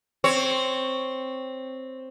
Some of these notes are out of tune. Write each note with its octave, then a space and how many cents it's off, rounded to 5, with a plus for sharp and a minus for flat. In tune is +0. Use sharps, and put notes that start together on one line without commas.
C4 +0 C#5 +0